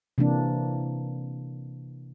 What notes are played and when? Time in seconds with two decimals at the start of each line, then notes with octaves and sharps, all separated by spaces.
0.18 C3 E3 A#3 D4